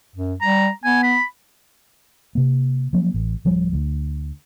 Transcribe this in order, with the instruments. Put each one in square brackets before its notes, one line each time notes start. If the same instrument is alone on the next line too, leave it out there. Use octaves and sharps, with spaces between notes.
[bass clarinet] F#2
[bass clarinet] G3 [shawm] A#5
[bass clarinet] B3 [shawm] G#5
[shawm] B5
[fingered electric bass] C3 A#3
F3 F#3 A#3 C#4
A1
D1 F3 G3
D2